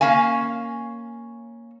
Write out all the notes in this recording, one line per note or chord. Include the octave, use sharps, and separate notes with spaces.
A#3 C#4 F5 G#5